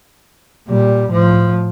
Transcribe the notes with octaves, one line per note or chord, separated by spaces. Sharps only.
A#2 G3
A2 F3